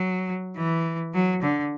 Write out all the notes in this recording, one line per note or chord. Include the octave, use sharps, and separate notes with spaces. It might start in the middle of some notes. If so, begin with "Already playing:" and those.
Already playing: F#3
E3
F#3
D3